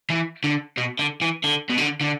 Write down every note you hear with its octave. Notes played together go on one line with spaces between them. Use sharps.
E3
D3
B2
D3
E3
D3
B2
D3
D3